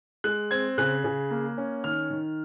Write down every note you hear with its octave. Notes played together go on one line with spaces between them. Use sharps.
G#3 F#6
C4 G#6
C#3 F#6
C#3
A#3
C#4
D#3 F6
D#3